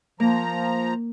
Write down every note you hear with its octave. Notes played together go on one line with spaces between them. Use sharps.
F3 A#3 A#5